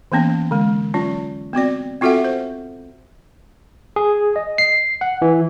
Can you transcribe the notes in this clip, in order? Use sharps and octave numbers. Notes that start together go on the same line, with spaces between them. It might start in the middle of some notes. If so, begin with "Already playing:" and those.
E3 A#3 B3 C#4
D3 G#3
F#3 C#4 F4
B3 C4 F#4 D5
C4 F4 F#4 A4 E5 F#5
C5
G#4
D#5
C7
F#5
E3